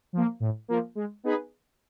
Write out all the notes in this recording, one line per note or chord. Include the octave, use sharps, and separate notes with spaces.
F3 A#3
A2
F3 A#3
G#3
B3 D#4 G#4 B4